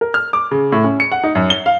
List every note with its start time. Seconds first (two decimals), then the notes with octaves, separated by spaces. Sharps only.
0.01 A#4
0.14 F6
0.33 D6
0.51 C#3
0.72 A2
0.84 C#4
1.00 C#7
1.12 F#5
1.23 D#4
1.35 F#2
1.50 G7
1.66 F5